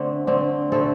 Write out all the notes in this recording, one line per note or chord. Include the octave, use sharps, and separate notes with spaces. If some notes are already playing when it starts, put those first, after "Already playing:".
Already playing: D3 A3 C4
D3 A3 C4
D3 A3 C4 A4